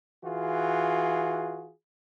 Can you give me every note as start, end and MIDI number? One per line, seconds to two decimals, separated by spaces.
0.25 1.72 52
0.25 1.72 65
0.25 1.72 66
0.25 1.72 68